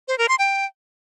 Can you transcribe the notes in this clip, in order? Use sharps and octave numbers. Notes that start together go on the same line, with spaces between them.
C5
A#4
C6
G5